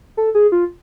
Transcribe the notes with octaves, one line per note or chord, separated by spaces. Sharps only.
A4
G#4
F4